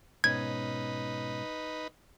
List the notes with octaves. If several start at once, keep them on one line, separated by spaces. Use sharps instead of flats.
G#2 B2 C#4 D#4 B4 G#6